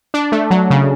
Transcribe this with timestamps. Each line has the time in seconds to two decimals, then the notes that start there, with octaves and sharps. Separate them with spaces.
0.14 D4
0.32 A3
0.51 F#3
0.70 C#3